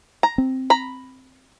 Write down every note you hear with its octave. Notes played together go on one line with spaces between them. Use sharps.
A#5
C4
A#5 B5